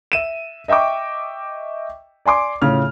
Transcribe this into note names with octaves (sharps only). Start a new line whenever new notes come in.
E5 D#7 E7
D#5 E5 G5 C#6 D6
D5 G#5 C6 D6
A2 C#3 F4 F6